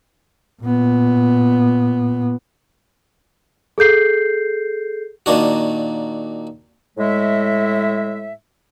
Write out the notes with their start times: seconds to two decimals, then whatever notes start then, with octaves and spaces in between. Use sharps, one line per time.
0.62 A#2 B3
3.78 G#4 A4 G6 C7
5.26 A#2 D#3 D4 F#4
6.98 A2 G#3 E5